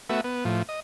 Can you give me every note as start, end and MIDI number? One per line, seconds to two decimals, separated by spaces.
0.09 0.21 57
0.09 0.21 59
0.09 0.21 66
0.09 0.21 76
0.24 0.44 59
0.45 0.62 45
0.45 0.62 53
0.69 0.80 75